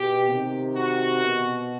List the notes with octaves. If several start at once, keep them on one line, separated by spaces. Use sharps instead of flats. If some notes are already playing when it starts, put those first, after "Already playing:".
Already playing: B2 G4
C3 D#3
F#4
B2